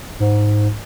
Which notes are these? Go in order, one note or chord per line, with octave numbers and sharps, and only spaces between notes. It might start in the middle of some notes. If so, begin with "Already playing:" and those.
G#2